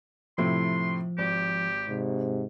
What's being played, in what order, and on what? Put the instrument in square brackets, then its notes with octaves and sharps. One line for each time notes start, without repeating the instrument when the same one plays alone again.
[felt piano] A2 C3 E4 [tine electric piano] F3 [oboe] C6
[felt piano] G#1 [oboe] G4
[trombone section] G#2 C3